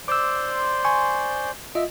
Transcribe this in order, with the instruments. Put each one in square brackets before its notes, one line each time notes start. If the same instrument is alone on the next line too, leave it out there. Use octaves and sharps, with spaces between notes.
[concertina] C5 D5 C6 [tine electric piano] D6 E6
[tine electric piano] G#5 C#6
[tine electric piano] F4 D#5 [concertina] E5